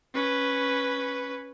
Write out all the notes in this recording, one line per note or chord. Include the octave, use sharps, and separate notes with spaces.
C#4 B4